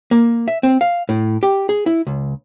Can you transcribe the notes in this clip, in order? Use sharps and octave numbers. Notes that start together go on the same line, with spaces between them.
A#3
E5
C4
F5
A2
G4
G#4
E4
C#2